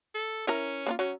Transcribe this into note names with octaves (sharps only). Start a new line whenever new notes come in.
A4
C#4 E4 A#4 A#5
A#3 D4 F4
F#3 C#4